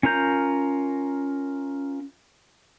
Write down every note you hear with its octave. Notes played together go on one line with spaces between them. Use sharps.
C#4 F4 A#4 A#5 G6